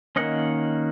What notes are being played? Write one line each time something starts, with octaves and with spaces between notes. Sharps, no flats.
D#3 A#3 C#4 D#5 F#5